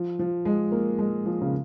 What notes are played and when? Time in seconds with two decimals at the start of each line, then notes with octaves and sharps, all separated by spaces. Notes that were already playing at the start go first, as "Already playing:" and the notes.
Already playing: F3
0.19 F3
0.45 G#3
0.72 A#3
0.99 G#3
1.26 F3
1.42 C#3